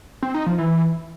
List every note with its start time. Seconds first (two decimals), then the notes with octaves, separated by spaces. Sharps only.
0.23 C4
0.34 D#4
0.46 F3
0.58 E3